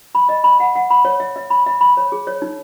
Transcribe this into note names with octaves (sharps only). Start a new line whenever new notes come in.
B5
D#5
B5
F#5
F#5
B5
C#5
E5
E5
B5
E5
B5
C#5
G#4
C#5
D#4